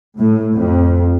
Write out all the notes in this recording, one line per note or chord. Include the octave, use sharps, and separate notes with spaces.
A2
F2